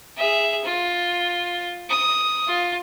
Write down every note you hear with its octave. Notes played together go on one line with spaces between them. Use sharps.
G#4 E5
F4
D#6
F4